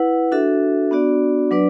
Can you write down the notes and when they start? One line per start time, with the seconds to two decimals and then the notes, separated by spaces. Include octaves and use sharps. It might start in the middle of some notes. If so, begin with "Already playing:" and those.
Already playing: E4 B4 F#5
0.32 D4 F#4 A4 E5
0.91 B3 D4 F#4 D5
1.51 F#3 D4 B4 D5